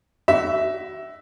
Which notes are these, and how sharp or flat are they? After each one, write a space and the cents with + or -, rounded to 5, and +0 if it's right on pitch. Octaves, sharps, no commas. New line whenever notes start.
F#4 +30 E5 +0